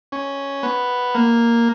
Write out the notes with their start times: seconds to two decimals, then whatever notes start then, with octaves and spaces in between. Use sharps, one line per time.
0.12 C#4
0.63 B3
1.15 A#3